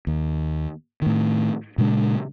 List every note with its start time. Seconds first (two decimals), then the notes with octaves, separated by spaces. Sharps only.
0.07 D#2
1.02 A2 D#3
1.78 A#2 C#3 G#3 D4